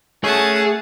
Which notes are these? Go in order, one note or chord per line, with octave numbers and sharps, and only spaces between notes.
A3 C#4 G#4 F#5 A5